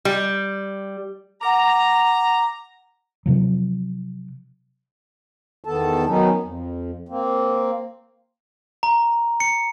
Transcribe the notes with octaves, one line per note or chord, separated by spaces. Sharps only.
G3
F#5 A#5 D6
C3 F3 F#3
E2 D#3 B3 A4 A5
D#3 F#3 B3 C#4 D#4
F2
A#3 C4
A#5
C#7